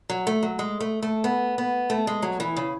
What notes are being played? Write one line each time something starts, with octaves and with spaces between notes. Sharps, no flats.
F#3
A3
F#3
G#3
A3
A3
B3
B3
A3
G#3
F#3
E3
C#3